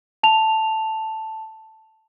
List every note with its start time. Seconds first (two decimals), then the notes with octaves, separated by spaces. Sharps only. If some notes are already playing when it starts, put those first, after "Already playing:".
0.23 A5 F7